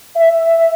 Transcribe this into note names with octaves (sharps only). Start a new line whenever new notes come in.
E5